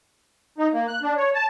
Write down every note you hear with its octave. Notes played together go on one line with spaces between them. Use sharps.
D#4
A#3
F#6
D4
C#5
A5